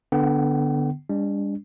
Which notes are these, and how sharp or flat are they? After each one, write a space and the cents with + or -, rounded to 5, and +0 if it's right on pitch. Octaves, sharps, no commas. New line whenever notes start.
D3 +0 B3 +0 G5 -40
G3 +45 D4 -30